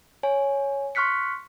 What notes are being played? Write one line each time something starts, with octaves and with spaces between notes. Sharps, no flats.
C#5 G#5
C6 C#6 F6 F#6 B6 C#7